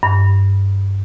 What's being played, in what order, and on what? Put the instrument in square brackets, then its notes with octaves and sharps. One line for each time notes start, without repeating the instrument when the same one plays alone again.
[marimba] G2